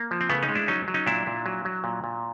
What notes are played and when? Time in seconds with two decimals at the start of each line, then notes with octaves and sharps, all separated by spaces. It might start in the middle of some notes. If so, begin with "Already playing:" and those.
Already playing: A#3
0.11 F3
0.21 C4
0.29 C#3 A3 B3
0.43 C#4 D#4
0.49 G#3
0.55 D4 E4
0.68 F#3 C#4 D#4
0.88 F#3
0.94 C#4 D#4
1.06 A#2 D4 E4
1.27 A#2
1.46 F#3
1.65 F#3
1.84 A#2
2.04 A#2